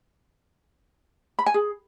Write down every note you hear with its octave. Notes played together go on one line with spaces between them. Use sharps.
B5
G#5
G#4